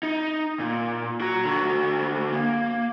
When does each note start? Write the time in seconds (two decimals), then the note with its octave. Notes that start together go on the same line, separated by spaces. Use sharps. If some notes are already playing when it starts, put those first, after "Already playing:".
0.03 D#4
0.59 A#2
1.21 F#4 A#5
1.45 D3 F#4
2.32 A#3